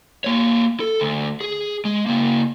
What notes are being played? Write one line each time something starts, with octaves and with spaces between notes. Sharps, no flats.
A#3 C#5
A4
D2
G#4
G#3
C#3 A#3